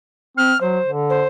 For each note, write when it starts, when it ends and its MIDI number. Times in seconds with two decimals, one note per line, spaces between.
0.37 0.53 60
0.37 0.60 89
0.60 0.79 54
0.60 0.90 72
0.85 1.24 50
1.09 1.28 72